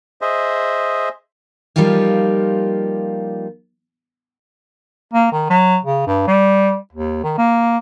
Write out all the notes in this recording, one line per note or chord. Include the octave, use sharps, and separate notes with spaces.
G#4 C5 D#5 E5
F3 G3 A#3 D#4 F4 G4
A#3
D#3
F#3
C#3
G2
G3
D#2
D#3
A#3